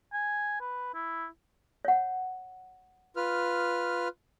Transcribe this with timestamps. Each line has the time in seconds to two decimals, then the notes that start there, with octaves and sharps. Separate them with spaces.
0.13 G#5
0.61 B4
0.94 E4
1.85 C#5 F#5
3.16 F4 B4 F6